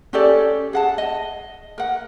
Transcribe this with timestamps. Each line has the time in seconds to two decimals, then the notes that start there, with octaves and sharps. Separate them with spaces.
0.13 C#4 G4 A4 D5
0.73 G#4 F#5 A5
0.98 D#5
1.78 A#4 F#5